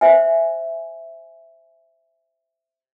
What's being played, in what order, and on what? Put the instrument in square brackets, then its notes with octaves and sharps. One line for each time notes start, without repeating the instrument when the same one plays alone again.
[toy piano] C5 E5 G#5